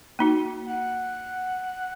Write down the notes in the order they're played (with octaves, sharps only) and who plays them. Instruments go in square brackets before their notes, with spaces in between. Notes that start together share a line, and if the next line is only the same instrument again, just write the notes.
[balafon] A#3 D#4 F#4
[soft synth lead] F#5